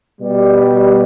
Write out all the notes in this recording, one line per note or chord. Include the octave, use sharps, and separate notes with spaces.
B2 G3